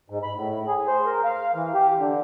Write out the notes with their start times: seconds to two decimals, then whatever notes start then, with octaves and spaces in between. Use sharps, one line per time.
0.10 G#2
0.23 B5
0.37 A2
0.68 G#4
0.87 C5
1.06 A#4
1.24 F5
1.55 E3
1.74 G4
1.99 D3